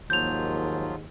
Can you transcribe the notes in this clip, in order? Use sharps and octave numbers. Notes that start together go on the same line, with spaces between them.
D#2 G#2 F3 F#3 F4 G6 F7